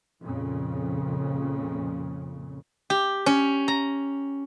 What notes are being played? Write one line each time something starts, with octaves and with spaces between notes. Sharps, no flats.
F2 A#2 C#3
G4
C#4
A#5